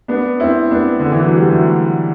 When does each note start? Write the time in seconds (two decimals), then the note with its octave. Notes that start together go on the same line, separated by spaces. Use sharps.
0.08 B3 D4
0.40 C4 E4
0.71 B3 D4
1.00 D3
1.12 E3
1.24 F#3
1.37 G3
1.49 F#3 A3